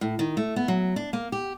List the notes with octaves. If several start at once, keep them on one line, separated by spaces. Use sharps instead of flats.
A2
D#3
A3
B3
F#3
D4
A#3
G4